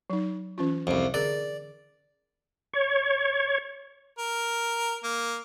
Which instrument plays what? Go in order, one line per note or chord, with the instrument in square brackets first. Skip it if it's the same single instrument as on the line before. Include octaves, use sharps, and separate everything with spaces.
[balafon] F#3 D#4
E3 C#4 F4
[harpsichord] C2 F2
[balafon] D3 G#4 A#4 [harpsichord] D5
[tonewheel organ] C#5
[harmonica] A#4
A#3